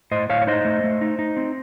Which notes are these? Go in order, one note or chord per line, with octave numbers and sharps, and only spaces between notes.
A2 C5 D#5
A2 C#5 F5
C#5
D#4 C5 D#5
A3
A3
D#4
D#4
C4